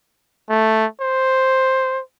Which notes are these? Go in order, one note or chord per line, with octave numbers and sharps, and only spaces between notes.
A3
C5